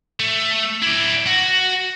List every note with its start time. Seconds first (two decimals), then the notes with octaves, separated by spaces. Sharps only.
0.20 A3
0.83 E4 D5
1.27 F#4